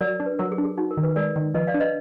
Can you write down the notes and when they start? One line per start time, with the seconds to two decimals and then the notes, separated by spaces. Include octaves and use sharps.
0.01 F#3 A#4 D5
0.20 D4
0.26 B4
0.39 F#3 A#4
0.52 G#4
0.58 D4
0.65 G#4
0.78 D#4 F#4
0.91 A#4
0.97 D#3
1.03 B4
1.16 G#3 A#4 D5
1.36 D#3
1.54 F3 B4 D#5
1.67 D5 F5
1.74 D4
1.80 B4 D#5